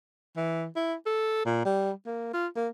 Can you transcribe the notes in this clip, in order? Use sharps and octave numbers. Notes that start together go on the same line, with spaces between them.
E3
E4
A4
A#2
G3
A#3
F4
A#3